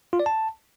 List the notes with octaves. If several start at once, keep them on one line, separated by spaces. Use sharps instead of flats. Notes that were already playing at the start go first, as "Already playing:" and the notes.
F4
D5
A5